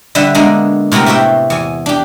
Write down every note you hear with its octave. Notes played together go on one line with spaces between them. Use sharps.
D3 G3 G4 B4 E5
D3 G#3 A#3 B3 D4
A2 C3 B3 G4 A#4
A3 F#4 G4 E5 G5
E2 G#5
D4 G4